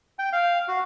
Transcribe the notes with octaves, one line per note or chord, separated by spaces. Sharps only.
G5
F5
F#4